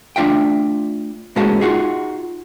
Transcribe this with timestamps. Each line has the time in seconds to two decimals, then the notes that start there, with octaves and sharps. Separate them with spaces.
0.16 A3 D4 F4 E5 G5
1.36 A2 G#3 A#3 C#4 F#4 A5
1.61 D#4 F4 F#4 G#4